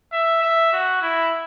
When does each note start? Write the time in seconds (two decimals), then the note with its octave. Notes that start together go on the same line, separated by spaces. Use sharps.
0.12 E5
0.43 E5
0.73 F#4
1.02 E4